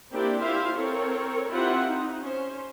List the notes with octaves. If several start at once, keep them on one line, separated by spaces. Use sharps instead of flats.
A#3 C4 D4 E4 G4 D5
E4 F4 G4 C5 E5 F5
C4 A4 A#4 C#5
C4 E4 F4 G4 E5 F#5
D#4
C#4 C5